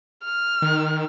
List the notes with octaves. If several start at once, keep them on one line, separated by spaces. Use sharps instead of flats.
F6
D#3